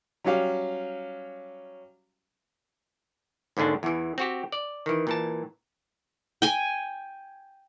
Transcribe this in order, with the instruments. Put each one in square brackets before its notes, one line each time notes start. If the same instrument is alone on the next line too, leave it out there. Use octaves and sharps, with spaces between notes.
[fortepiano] F#3 G3 C#4 G4 F5
[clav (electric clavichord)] G#1 D#2 G#2 D3 D4
E2 E3
C4 F#4 G4
D5
D#3 E3
A#2 E3 A5
[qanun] G5 G#5